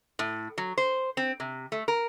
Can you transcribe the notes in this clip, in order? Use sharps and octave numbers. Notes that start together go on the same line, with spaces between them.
A2
F#3
C5
C4
C3
A3
A#4